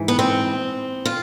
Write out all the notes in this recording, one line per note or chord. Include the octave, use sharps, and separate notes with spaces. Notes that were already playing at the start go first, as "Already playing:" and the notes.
Already playing: G#2 E3
B3
C4
F4